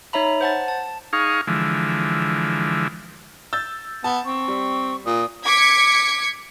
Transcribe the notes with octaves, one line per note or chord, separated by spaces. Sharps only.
D#4 C#5 E5 A#5 B5
C5 F#5 A5 A6
A5
D#4 G#4 F5 C#6
D3 E3 F3 G#3
E6 G6 A6
B3 A5
C4 C#6
G3
A#2 D#6
D6 G#6 B6 C#7